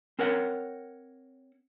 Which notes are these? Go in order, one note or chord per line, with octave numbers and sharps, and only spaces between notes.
C4 A#4 C#5 F#5